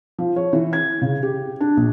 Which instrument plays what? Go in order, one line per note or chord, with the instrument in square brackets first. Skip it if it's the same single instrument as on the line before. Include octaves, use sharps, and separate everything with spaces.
[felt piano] F3
C#5
E3
G#6
C#3
G4
D4
A#1